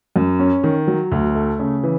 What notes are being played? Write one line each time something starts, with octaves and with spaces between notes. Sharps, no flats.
F#2
C#4
D#3
F#3
D2
A3
C#3
E3